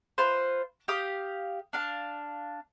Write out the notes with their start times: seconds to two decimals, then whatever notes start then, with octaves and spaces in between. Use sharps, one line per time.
0.18 F4 B4 C5
0.88 G4 F5 D#6
1.73 D4 F5 A5